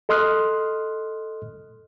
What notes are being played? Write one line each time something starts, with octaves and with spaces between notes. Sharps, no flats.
A4 D#5 C6 D#6 F6 F#6